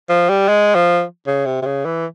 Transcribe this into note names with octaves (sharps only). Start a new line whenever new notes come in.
F3
G3
G#3
F3
C#3
C3
C3
C#3
E3